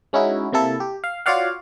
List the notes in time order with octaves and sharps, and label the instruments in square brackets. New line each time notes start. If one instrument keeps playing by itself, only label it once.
[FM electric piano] G#3 C#4 D#4 E4 F#4
C3 A#3 E4 A4
G4
F5
F4 F#4 C#5 D5 F5 F#5